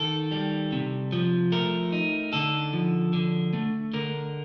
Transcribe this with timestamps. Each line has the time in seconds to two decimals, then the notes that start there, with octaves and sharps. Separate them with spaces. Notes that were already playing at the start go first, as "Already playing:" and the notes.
Already playing: D#3 A4
0.32 G3
0.72 C3
1.12 F3
1.52 A3 A#4
1.92 D#4
2.33 D3 A4
2.73 F3
3.13 D3
3.53 A3
3.94 D3 A#4